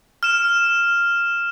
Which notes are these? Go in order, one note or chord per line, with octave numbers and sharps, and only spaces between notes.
F6 E7